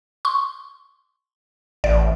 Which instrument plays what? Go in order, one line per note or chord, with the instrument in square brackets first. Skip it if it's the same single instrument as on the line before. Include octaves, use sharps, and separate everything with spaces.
[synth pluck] C6 C#6
[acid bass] A1 [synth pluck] D5